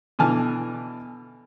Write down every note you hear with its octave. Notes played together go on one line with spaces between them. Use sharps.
B2 D3 E3 G#5 A5 F6